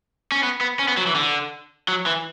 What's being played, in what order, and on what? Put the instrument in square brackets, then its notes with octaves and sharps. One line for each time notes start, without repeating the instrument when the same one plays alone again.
[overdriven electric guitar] C#4
B3
B3
C#4
B3
F#3
E3
D3
F#3
E3